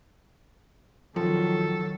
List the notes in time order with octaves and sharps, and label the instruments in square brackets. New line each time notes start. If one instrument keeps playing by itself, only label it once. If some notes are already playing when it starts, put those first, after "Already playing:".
[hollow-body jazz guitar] F2 F3 [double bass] D#3 F#3 [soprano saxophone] A4